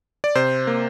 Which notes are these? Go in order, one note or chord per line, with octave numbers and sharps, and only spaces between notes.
D5
C3 C5
A#3